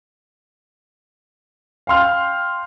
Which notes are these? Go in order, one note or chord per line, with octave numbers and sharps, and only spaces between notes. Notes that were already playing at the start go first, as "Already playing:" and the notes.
F5 G5 C6 F6